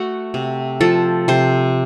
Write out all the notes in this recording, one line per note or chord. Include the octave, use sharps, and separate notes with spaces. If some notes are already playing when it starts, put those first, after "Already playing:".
Already playing: A3 F#4
C3
F3 A4
C3 C5